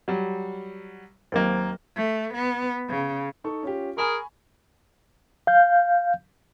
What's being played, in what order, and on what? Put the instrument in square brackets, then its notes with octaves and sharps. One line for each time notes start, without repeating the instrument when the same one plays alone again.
[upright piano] F#3 G3
[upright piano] D#2 A#3 [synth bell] F#3 A#4 C5
[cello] A3
B3
C#3
[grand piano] D#4 A4 C#6
C#4 F4 G4
[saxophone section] G#4 A#4 [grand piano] G#5 B5 C#6
[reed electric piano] F5 G6